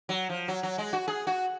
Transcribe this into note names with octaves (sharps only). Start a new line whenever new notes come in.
F#3
F3
F#3
F#3
G#3
F#4
G#4
F#4